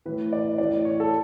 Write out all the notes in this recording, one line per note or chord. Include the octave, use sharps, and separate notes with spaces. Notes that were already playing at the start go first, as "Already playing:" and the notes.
A2 E3 B4
D5
A2 E3 D5
C#5
A4